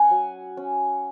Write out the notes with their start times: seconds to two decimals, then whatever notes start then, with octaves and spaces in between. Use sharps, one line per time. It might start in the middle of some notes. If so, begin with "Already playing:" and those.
Already playing: C#4 F#5 G#5
0.11 F#3
0.57 C#4